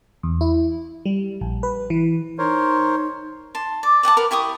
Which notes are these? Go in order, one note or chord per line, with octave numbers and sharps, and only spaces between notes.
E2
E4
G3
A#1
B4
E3
D#4 A#4 C5 C#5
A5 C6
D5
D5 F#5 G5 A5
A#4 B4 F#5
E4 G4 C#6 D#6